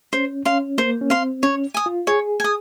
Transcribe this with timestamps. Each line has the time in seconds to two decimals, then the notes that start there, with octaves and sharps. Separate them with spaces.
0.13 C#4 C5
0.45 C#4 F5 C6
0.78 A#3 C5
1.01 C#4
1.10 C4 F5 C6
1.43 C#4 C#5
1.74 G#5 D#6
1.86 F4
2.07 G#4 C#5
2.40 G#5 D#6